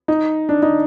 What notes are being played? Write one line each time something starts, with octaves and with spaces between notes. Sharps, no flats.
D#4
D4
D#4